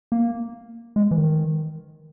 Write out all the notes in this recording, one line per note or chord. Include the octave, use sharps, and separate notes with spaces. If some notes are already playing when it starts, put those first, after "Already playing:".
A#3
G#3
E3
D#3